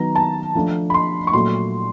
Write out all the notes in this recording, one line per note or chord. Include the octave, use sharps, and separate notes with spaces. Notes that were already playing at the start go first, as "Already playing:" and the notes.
Already playing: D#3 F#3 B3 A#5
A5
F3 A3 D4
B5
C6
C#6
A#2 F#3 A3 C6